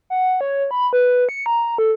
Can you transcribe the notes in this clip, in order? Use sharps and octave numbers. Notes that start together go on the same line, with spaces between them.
F#5
C#5
B5
B4
C#7
A#5
A4